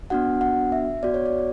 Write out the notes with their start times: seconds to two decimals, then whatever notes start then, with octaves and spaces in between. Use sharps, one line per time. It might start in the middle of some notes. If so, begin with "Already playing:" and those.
0.10 B3 D4 F#4 F#5
0.41 F#5
0.72 E5
1.03 B3 F#4 D5
1.14 C#5
1.26 D5